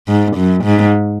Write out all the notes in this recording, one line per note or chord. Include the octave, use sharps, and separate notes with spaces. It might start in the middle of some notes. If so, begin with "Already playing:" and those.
G#2
F#2
G#2